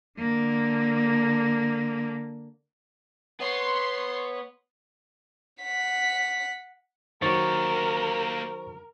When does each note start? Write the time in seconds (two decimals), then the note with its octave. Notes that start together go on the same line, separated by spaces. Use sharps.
0.18 D3 A#3
3.40 B3 C#5 C6
5.63 F#5 B6
7.22 D#3 F#3 A#3 G4 A#4 C5 C#6 A6